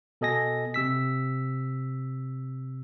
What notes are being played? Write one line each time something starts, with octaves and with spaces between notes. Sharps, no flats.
B2 A4 D#5 G#5 A#6
C3 E6 B6